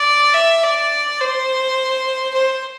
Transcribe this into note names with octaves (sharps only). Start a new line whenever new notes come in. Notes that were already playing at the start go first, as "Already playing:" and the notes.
Already playing: D5
E5
D5
C5
C5